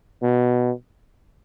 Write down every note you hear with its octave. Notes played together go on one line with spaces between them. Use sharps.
B2